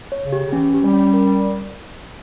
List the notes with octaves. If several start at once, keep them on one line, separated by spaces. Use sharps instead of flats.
C#5
C#3
G4
C#3
E3 C#4
G4
G3
C#4
A#4